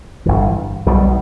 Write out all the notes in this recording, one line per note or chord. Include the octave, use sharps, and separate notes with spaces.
G1 G2 E3
B1 B2 G3